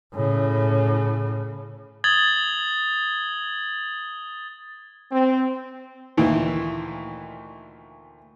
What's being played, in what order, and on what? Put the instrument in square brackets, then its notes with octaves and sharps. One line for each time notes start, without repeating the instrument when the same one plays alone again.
[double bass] A2 C#3
[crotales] D#6 G#6 A6 F#7 G7
[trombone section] C4
[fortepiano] D2 A#2 D#3 E3